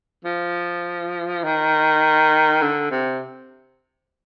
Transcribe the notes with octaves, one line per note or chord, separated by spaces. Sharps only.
F3
D#3
D3
C3